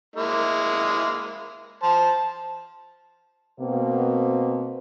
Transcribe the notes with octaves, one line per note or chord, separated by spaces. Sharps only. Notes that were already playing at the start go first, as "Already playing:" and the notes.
G#3 A#3 E4
C5 A5
B2 A#3 C4